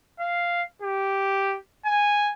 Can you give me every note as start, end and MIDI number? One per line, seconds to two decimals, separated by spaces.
0.20 0.62 77
0.82 1.57 67
1.86 2.32 80